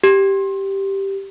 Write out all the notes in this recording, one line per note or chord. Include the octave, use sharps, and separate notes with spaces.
G4